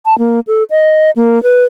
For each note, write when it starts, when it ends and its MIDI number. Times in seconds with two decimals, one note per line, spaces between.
0.06 0.17 81
0.18 0.40 58
0.47 0.63 69
0.70 1.11 75
1.16 1.42 58
1.43 1.65 71